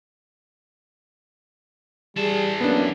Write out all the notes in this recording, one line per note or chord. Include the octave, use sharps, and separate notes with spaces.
E3 G3 G#4 A5
F#2 A#3 B3 D4